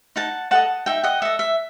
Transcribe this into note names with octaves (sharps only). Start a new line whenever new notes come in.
D#4 F#5 A5
A4 D#5 F#5 A5
D#4 E5 G5
D#5 F#5
A4 D#5 E5
E5